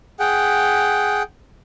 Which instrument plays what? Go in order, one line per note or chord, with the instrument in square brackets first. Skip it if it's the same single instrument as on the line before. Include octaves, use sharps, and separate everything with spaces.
[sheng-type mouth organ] G#4 F#5 G5